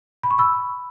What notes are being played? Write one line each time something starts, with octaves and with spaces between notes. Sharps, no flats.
B5
C#6
B5 E6